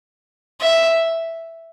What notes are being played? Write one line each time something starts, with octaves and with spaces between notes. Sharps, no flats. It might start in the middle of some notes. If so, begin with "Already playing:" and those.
E5